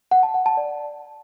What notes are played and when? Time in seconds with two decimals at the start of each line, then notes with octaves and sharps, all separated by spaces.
0.11 F#5
0.23 A5
0.34 F#5
0.46 A5
0.57 D5